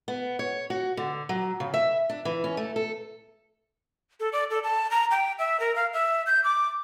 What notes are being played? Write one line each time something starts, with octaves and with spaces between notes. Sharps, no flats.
B3
C#5
F#4
D3
F#3
C#3
E5
D4
E3
C#4
A3
A4
A4
D5
A4
A5
A#5
G5
E5
A#4
F5
E5
G6
D6